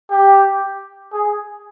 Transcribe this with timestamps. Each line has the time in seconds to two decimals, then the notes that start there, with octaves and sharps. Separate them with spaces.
0.11 G4
1.12 G#4